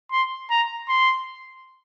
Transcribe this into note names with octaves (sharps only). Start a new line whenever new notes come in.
C6
A#5
C6